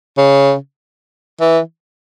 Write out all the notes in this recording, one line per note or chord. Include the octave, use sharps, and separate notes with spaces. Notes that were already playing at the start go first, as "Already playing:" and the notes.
C#3
E3